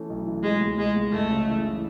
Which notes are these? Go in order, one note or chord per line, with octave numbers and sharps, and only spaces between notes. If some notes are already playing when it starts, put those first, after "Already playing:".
Already playing: E3 A3 C#4
B1
E3
B2 G#3
C#2
C#2 G#3
C#2
F#1 A3
C#3
E3
E3